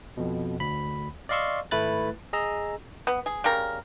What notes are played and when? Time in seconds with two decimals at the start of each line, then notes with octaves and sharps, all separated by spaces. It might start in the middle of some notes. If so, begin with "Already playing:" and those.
0.17 F2 B2
0.60 D2 B5
1.29 D5 D#5 F5 C6 C#6 E6
1.71 G#1 A3 E4 B4 F#6 A6
2.33 G#4 D#5 A#5 E6
3.07 B3
3.26 G#4
3.44 C#3 G3 A#4